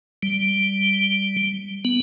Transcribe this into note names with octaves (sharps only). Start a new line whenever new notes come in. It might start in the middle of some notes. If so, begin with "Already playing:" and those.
G3
B3